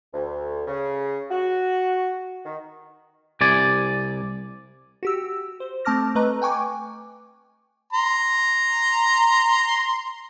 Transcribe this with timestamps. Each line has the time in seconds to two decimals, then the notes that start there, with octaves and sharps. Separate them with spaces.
0.14 D2
0.67 C#3
1.30 F#4
2.45 D#3
3.41 C2 C3 D5 G#5
5.03 F#4 G4 E6
5.60 C5
5.85 A3 C4 A5 D6 F6 A#6
6.15 A3 B4 D#5 A#5 F#6
6.42 G5 G#5 C#6 D6
7.93 A#5 C6